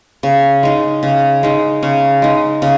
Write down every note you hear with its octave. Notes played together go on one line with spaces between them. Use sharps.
C#3
G#3 D#4
C#3
G#3 D#4
C#3
G#3 D#4
C#3